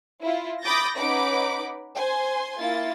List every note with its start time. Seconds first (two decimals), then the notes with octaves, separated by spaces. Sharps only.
0.23 E4 F4
0.62 B5 D6 D#6 G6 A6 A#6
0.96 C#4 D#4 B4 F#5 B5 D6
1.96 C5 G#5 C6
2.58 A#3 E4 F4 A6